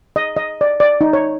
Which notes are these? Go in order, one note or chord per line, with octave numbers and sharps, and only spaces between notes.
D#5
D#5
D5
D5
D#4
C#5